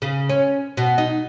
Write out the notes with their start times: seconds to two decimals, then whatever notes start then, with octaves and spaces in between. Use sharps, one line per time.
0.02 C#3
0.29 C#4
0.77 B2
0.98 D#4